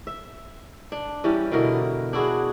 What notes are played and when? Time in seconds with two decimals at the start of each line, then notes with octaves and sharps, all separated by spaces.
0.07 E5
0.92 D4
1.24 E3 G3 C#4
1.52 B2 D3 E3 A#4
2.13 D4 E4 F#4 G#4